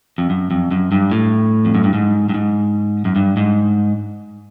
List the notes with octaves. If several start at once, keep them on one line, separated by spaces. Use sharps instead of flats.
F2
F#2
F2
F#2
G2
A2
F2
F#2
G2
G#2
G2
G#2
F#2
G2
G#2